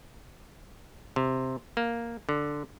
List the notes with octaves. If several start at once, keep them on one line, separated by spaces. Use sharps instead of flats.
C3
A#3
D3